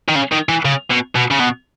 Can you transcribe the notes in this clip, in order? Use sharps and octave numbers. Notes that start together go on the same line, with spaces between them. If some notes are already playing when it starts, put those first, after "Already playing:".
D#3
C#3
D#3
E3
C#3
B2
B2
C#3
B2